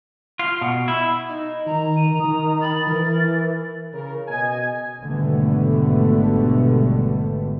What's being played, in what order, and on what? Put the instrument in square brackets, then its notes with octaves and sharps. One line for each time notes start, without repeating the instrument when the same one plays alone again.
[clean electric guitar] F4
B2
E4
[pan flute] D#4 [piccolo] D#5
[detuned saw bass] D#3 [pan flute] A#5
[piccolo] D#7
[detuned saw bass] D#3 [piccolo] D#6
[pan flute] B5 [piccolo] A6
[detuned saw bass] E3 [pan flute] A#4
[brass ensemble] C#3 A#4
B2 D#5 G#5
[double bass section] G#1 B2 D3 G3 A3 B3